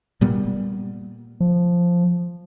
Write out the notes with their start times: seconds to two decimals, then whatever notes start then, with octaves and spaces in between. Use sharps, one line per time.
0.21 A#2 G3 B3
1.40 F3